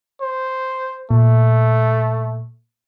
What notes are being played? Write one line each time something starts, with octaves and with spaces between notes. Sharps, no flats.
C5
A#2 A3